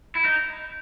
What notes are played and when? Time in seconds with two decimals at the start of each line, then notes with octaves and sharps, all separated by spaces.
0.15 E4
0.25 D#4